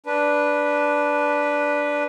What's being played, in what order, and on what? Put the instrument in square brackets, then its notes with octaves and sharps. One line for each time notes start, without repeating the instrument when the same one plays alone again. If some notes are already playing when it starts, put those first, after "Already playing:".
[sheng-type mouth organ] D4 B4